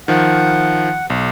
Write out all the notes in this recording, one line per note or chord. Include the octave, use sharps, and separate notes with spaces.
D#3 F3 F#5
B1